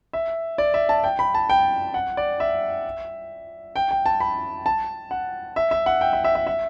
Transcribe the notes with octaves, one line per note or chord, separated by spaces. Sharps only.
E5
D5
E5
A5
G5
B5
A5
G5
F#5
D5
E5
G5
G5
A5
B5
A5
F#5
E5
E5
F#5
G5
E5
E5
E5
E5